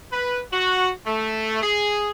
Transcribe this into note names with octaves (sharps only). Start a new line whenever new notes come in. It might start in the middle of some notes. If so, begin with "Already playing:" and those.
B4
F#4
A3
G#4